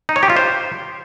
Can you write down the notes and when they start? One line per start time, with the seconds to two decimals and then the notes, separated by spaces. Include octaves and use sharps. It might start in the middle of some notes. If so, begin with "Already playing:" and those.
0.09 D#4
0.16 C#5
0.23 G4
0.30 F4
0.37 C5